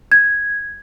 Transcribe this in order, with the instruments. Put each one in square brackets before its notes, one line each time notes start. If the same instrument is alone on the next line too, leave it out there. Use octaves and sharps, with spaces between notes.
[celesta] G#6